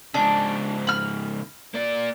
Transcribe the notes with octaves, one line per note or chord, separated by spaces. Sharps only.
G#2 C#3 D4
B5 F6
A#3 D5